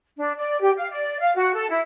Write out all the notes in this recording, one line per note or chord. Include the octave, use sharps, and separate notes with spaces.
D4
D5
G4
F5
D5
F5
F#4
A4
E4